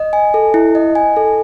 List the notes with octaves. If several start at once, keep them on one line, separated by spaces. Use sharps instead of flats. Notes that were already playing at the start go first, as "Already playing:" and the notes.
Already playing: D#5
G#5
A4
E4
D#5
G#5
A4